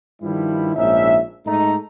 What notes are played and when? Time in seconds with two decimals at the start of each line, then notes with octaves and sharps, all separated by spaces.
0.22 G2 D#3 F3 G3 E4
0.76 A#1 G#2 F3 C#4 D#4 E5
1.46 G#2 A3 D#4 A#5